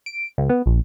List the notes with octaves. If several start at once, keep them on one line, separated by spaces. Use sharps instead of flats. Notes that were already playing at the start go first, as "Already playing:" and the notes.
D7
C#2
B3
A#1